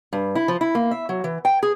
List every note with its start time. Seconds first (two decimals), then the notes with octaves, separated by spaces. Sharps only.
0.13 G2
0.35 E4
0.48 F3
0.61 E4
0.75 A#3
0.91 E5
1.09 F#3
1.24 E3
1.45 G5
1.63 G#4